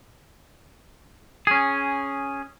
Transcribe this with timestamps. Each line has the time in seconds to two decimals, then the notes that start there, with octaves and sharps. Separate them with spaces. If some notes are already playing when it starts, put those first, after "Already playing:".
1.47 C#4 G#4